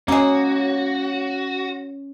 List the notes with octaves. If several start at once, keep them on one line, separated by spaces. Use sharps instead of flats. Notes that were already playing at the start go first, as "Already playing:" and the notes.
G#3 A#3 C#4 F#4